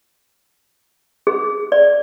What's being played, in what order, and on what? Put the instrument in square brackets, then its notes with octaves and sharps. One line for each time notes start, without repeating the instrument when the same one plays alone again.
[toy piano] G#4
D5